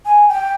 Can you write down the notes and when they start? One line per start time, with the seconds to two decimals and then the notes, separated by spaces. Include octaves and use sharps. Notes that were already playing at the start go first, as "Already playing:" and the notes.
0.06 G#5
0.28 G5